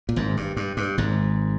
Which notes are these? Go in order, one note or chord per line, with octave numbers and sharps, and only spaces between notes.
A#2
G#1 G#2
G2
G2
G2
G#1 G#2